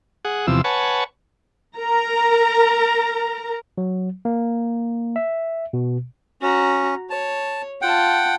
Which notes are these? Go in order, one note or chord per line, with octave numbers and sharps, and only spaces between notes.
G#4 F#5
E2 C3 F3 E6
B4 C#5 F#5 G#5 A5
A#4 A#5
F#3
A#3
E5
B2
C#4 F#4 A#5
C#5 A5
F4 F#5 G5 A5